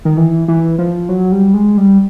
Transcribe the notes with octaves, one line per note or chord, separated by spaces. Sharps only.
D#3
E3
E3
F3
F#3
G3
G#3
G3